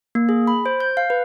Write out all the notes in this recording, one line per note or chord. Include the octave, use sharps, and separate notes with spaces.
A#3
G#4
B5
C5
G6
F5
B4